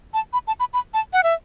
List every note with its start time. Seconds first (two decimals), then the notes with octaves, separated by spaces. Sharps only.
0.14 A5
0.33 B5
0.47 A5
0.60 B5
0.74 B5
0.94 A5
1.13 F#5
1.23 E5